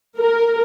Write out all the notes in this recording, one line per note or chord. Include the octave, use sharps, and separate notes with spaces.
A#4